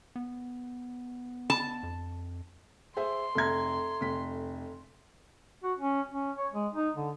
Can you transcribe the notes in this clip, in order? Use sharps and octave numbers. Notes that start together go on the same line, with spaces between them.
B3
A5
F2
G#4 C5 E5 C6
F1 A4 E5 A#5 G#6
F1 B6
F#4
C#4
C#4
C#5
G#3
D#4
D3